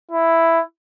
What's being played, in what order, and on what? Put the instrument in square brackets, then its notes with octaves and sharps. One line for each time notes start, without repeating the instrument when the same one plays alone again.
[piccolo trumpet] E4